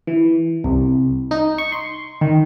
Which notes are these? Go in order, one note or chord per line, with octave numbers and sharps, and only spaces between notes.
E3
C2
D#4
C#6
C6
D#3